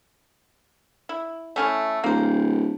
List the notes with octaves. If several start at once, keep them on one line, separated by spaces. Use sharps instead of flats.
E4
A3 C#4 E4
D1 A#3 C5